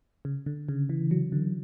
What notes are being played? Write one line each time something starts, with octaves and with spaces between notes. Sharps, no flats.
C#3
D3
C#3
E3
F#3
D3